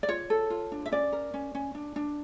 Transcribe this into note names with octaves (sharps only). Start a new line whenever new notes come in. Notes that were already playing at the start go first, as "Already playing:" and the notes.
D5
F4 C#5
A4
F4
D4
E5
C#4 D5
A#4
C#4
C#4
D4
D4